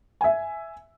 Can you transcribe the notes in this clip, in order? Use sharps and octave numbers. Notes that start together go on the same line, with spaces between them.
E5 G#5